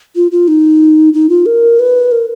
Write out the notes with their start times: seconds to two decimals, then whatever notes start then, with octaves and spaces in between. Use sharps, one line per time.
0.16 F4
0.31 F4
0.48 D#4
1.13 D#4
1.29 F4
1.46 A#4
1.79 B4
2.11 A#4